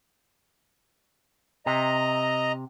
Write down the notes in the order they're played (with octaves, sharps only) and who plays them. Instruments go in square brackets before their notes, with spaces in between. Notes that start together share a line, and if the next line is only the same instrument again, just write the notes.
[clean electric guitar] C3 [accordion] D#5 A#5